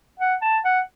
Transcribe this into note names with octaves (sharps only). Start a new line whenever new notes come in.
F#5
A5
F#5